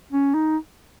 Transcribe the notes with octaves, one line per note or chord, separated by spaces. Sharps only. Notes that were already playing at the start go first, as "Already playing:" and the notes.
C#4
D#4